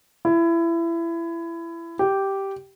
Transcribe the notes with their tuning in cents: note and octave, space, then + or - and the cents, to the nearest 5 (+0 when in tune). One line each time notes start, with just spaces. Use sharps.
E4 +25
G4 -5